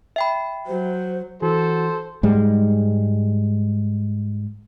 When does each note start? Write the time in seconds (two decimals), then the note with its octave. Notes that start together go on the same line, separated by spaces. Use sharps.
0.16 E5 G5 B5
0.67 F#3 C5
1.42 E3 F#4 A4 C5
2.23 G#2 G3 G#3